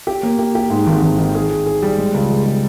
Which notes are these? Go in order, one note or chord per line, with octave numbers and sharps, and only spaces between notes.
G4
A#3
G4
G4
G#2
G#1
G#1
D#3
G#4
G#4
G#4
G3
G#3
C#2
G#3
G#3